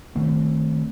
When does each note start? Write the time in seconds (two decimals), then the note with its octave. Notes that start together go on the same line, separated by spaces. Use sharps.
0.16 D#3 A3 C4